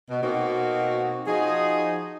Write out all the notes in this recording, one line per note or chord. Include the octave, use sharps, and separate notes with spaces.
B2
B2 A#3 C4 D#4 F#4
F3 D#4 F#4 G#4